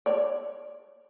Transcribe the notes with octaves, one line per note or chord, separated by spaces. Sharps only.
C#5 D5